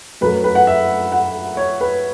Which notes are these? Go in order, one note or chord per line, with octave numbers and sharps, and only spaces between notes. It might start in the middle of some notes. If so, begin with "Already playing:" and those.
F#2 F#3 A3 B4
B4
F#5
E5
F#5
C#5
B4